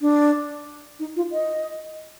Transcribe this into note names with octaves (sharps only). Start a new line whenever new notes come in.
D4
D#4
F4
D#5